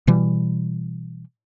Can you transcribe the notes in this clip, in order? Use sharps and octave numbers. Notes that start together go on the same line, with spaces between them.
B2 E3 G3